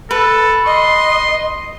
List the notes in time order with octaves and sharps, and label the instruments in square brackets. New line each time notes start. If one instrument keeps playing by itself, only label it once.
[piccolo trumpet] A4 [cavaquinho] B4
[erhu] D#5 [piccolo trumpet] C6